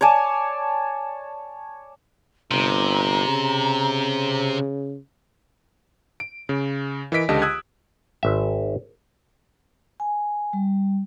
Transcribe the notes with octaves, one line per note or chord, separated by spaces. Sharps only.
C#5 D5 G#5 A5
G1 C3 A#5
C#3
D7
C#3
E3 A#4 D#5 B6 D7
C#2 D3 G4 D#5 A5
D#6 E6 F#6 G#6
G#1 E5
G#5
G3